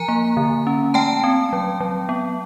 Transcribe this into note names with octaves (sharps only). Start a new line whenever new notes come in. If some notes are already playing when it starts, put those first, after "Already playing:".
Already playing: F3 G#5 A#5
A#3
D3
C#4
A3 G5 A5
C4
F#3
F#3
B3